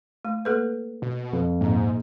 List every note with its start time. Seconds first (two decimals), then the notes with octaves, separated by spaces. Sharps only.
0.25 A3
0.45 A#3 A4 B4
1.02 B2
1.33 F2
1.61 A#1 G#2 D#4